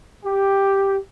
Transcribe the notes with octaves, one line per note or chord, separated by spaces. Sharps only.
G4